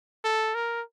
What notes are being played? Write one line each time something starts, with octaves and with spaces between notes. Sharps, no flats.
A4
A#4